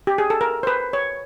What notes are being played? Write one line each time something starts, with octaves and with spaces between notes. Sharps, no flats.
G4
G#4
A4
A#4
C5
B4
C#5